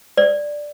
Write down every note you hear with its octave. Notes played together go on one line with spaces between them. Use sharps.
D5